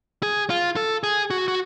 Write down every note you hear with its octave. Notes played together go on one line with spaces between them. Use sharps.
G#4
F4
A4
G#4
F#4
F#4